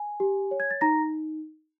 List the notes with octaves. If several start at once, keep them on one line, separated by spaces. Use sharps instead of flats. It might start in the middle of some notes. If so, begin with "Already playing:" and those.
Already playing: G#5
G4
C#5
G#6
A6
D#4 A#5 A#6